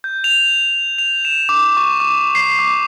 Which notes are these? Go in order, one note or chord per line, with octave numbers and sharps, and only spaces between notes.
G6
F7
F7
E7
D6
C#6
D6
C7
D6